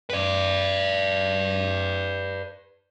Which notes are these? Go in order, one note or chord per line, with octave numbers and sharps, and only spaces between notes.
B4 D5